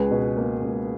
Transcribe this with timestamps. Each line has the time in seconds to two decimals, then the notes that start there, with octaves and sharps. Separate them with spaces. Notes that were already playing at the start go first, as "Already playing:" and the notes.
Already playing: C#2 G#4 B4
0.11 B2
0.37 A#3
0.62 C#2